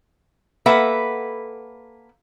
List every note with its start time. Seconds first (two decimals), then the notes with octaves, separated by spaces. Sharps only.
0.66 A#3 A4 B4 E5 F#5